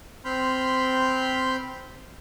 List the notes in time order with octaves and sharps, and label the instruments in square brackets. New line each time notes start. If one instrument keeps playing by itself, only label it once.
[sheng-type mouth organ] C4 B5 C6 F6 G6